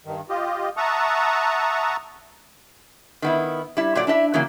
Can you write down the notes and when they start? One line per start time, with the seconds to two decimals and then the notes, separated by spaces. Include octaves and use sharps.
0.05 G2 D#3
0.29 F4 G4 D#5
0.77 E5 F#5 A5 A#5 C#6 D#6
3.22 D#3 B3 E4
3.77 G3 E4
3.95 A#2 F#3 D5
4.07 D4 E4 D#5 E5
4.34 C#3 E3 F#3 A#3